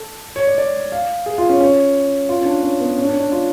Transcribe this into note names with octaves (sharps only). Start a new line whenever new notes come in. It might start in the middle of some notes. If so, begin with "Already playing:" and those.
Already playing: A4
C#5
D5
D5
F5
G#4
F4
C#4
C#4
F4
C#4
D4
C#4
B3
C#4
D4
C#4
D4
F4